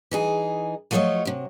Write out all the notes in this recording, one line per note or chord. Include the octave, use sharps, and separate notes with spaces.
E3 D#4 G#4
F3 F#3 A3 F4 C#5 D#5
C3 F#3